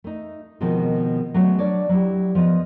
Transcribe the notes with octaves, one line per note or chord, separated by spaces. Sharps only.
A3 D#4
B2 D#3 F3 G#3 C4
F#3 G#3 A3 B3 F#4 G#4
D4 C#5 D5
F#3 E4 G4
F3 B3 D#5